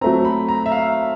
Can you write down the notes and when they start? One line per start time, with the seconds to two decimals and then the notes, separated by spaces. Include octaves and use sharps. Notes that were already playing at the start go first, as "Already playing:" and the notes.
0.01 F#3 A3 C4 A#5
0.25 B5
0.49 A#5
0.66 E5
0.72 F5